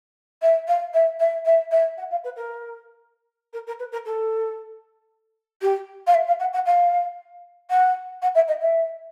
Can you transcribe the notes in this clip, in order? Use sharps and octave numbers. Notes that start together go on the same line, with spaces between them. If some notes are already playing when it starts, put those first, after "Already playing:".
E5
F5
E5
E5
E5
E5
F#5
F5
B4
A#4
A#4
A#4
B4
A#4
A4
G4
F5
E5
F5
F#5
F#5
F5
F#5
F#5
E5
D#5
E5